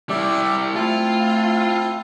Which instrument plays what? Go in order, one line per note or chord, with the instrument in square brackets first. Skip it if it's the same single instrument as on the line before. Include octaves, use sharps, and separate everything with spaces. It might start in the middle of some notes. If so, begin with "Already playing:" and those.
[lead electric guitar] G3 E4 [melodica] G4 D5 E5
[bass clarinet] A3 [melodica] C4 E4 A5 [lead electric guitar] F4